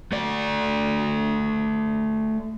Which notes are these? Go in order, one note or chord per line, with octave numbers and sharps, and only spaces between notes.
A3 D5